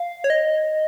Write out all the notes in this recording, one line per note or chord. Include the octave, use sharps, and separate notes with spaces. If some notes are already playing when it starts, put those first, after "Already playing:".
Already playing: F5
C#5
D#5